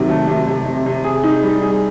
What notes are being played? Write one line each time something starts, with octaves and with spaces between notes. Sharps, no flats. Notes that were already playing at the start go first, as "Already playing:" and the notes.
Already playing: C3 D#3 F#3
A3
C3
C3
C3
C3
G#4
D#4
G3
G#4